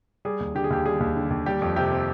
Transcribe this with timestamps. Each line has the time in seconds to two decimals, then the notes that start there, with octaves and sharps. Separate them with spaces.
0.25 G3 G#4
0.40 D#2
0.55 D3 G4
0.64 G#4
0.70 D#2 G4
0.85 G3 G#4
1.00 D#2
1.16 D3
1.30 D#2
1.46 G3 G4
1.62 F2
1.76 C3 G4
1.91 C4